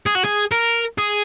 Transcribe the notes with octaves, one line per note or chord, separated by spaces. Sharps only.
G#4
F#4
G#4
A#4
G#4